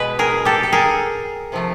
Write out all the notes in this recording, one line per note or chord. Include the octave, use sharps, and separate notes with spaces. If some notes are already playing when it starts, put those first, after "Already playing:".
Already playing: B2 G#3 B4
G#4 A#4
G4 A4
A4
G#4 A#4
C3 F3 A3